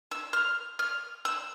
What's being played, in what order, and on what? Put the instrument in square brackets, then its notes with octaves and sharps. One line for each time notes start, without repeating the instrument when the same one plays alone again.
[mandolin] E6
F6
F6
E6